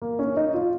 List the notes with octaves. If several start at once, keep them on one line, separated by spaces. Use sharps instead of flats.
A#3
C#4
D#4
F4